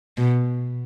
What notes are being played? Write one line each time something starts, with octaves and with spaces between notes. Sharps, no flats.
B2